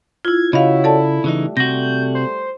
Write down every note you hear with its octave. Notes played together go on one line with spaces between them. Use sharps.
E4 F4 G#6
C#3 E4 F#4 C#5 D#5 F5
A4 D5 A5
C#3 E3 G3 A3 D#4
C3 F#4 G6 A#6
C5